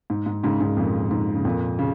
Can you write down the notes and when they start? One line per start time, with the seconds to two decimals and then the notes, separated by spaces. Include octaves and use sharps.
0.10 G#2
0.26 G#2
0.43 G#2 C#3
0.61 G#2 C#3
0.77 F2 A#2
1.11 G#2
1.35 C#3
1.45 F2 A#2
1.79 C#3